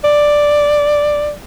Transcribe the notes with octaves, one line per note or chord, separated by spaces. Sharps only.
D5